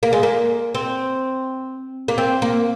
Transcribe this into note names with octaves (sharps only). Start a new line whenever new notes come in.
A#3
G#3
A#3
C4
A#3
C4
A#3